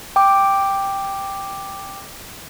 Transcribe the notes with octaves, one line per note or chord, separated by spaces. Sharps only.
G5 D6